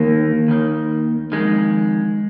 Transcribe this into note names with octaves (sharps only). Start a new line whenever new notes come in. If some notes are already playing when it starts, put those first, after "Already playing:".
Already playing: D#2 D#3 A#3
D#2 D#3
F2 D#3 G#3